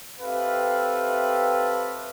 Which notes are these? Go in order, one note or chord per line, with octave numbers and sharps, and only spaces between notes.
C4 G4 A4 B4 E5 F5